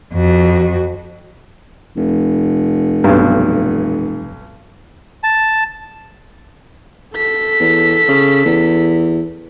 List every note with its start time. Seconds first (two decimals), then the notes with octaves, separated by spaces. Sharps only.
0.13 F2 F#4
1.96 F1
3.04 B1 G2
5.23 A5
7.15 A4 B6
7.60 E2
8.08 C#3
8.45 E2